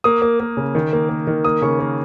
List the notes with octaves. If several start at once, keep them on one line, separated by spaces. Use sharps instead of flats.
A#3 D#6
A#3
A#3
C#3
D#3
A#3
A#3
D#3
A#3 D#6
C#3 C#6
A#3